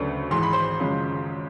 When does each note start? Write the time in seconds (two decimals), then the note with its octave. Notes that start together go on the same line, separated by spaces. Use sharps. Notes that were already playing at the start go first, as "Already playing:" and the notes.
Already playing: D2 C#3 F#3 A3 D4 B4
0.31 G#1 G#2 E3 G#3 C6
0.43 B5
0.53 C5 C6
0.80 G#1 F#2 C#3 F3 G#3